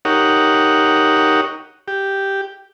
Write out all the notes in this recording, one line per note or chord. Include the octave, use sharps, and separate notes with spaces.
D#4 G4 A#4 C#5 F#5
G4